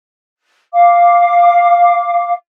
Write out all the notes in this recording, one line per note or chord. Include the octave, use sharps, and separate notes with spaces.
F5 D6